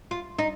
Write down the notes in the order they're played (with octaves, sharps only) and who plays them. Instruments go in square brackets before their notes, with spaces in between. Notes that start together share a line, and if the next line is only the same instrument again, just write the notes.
[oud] F4
D#4